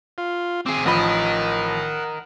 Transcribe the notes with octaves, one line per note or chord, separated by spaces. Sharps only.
F4
C4 G#4 D6
A1 F3 A#4 D#5 F#5 B5